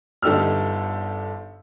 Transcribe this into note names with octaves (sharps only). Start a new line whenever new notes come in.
G1 D3 D#4 G4 E6 F6